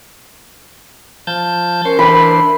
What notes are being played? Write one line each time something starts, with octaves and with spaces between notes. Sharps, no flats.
F3 A5 G6
C#4 A#4 C5
E3 D4 C5 B5